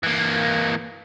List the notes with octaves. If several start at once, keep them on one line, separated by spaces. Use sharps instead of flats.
E3 A#3